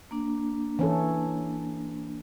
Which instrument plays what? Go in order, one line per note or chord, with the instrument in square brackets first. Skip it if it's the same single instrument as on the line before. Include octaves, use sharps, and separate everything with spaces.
[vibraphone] A#3 D4
[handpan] E3 C#4 A4